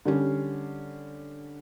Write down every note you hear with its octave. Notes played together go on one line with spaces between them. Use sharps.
D3 G3 C#4